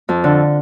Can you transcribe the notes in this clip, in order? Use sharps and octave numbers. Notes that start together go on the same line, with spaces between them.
F2
D3